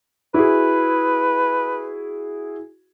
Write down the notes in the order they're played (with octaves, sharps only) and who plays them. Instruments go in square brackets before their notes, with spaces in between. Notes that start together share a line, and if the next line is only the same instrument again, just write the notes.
[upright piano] E4 F#4 G#4 [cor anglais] B4